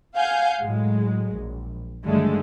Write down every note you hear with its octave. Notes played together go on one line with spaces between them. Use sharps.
F5 F#5 G#5 G6
A2 F#3 G#3
A#1
G2 D3 D#3 F#3 G#3 A3